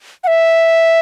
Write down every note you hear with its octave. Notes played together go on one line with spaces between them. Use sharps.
F#5
E5